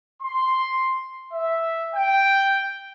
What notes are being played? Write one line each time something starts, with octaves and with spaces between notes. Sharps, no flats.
C6
E5
G5